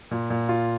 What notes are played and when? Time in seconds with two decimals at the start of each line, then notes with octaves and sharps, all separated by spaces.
0.11 A#2
0.30 A#2
0.49 F4